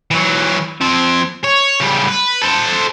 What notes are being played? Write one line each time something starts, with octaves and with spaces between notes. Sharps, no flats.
E3 F#3
F3 C4
C#5
C#3 G3
B4
A4 C5